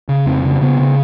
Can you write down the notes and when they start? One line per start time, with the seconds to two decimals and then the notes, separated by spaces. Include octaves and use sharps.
0.09 C#3
0.26 F2 C4
0.44 C#3
0.61 C#3 B3
0.79 C#3